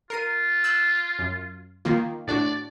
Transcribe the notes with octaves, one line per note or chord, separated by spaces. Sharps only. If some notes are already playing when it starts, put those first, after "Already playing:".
F4 A#4 C7 D#7
E6 F#6 G6
F#2
D#3 A#3 F4
A2 D4 F#4 D5